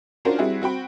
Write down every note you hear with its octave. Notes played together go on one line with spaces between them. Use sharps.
C#4 D4 F4 F#4 A#4 C5
G3 C4 E4 F#4 G#4
C4 F#4 G5 B5